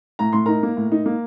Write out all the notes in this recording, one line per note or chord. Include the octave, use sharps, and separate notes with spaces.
A2 A#5
A2 C6
D#4 A#4 A#5
A#3
A2
D#4
A#3